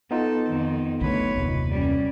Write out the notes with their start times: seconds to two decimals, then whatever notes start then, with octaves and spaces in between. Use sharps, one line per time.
0.11 B3 D#4 F4 A4
0.49 F2 D#3
1.01 B1 D3 A3 B4 C#5
1.36 F#1 D#2 C3
1.69 G3 C#4